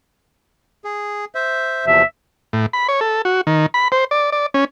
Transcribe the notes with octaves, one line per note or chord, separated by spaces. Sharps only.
G#4
C5 E5
E2 C3 F3 E5
A2
B5
C#5
A4
F#4
D#3
B5
C5
D5
D5
C#4